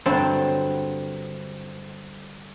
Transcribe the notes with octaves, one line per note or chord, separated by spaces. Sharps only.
G2 D3 F#3 C4 A5 C6